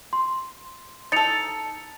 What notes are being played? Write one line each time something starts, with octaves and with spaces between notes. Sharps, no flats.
C6
D#4 A4 A6 C#7 F7